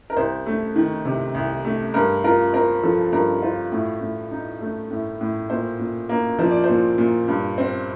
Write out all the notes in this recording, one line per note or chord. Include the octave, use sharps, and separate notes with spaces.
A#4
C2 C5
A3
D#3
C3
C2
A3
G2 A#4
F4 A#4
C4 A#4
F3 A4
G2 A#4
F4 C5
A2
A2
D#4
A3
A2
A2
A#2 C5
A#2
A#3
F3 C5
D5
C5
A#2
A#2
G2
C4